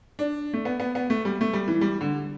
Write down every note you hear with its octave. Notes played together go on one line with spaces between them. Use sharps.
D4
A3
B3
B3
B3
A3
G3
A3
G3
E3
G3
D3